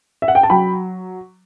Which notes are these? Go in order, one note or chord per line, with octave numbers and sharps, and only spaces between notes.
E5
F#5
G5
A5
F#3 G5 B5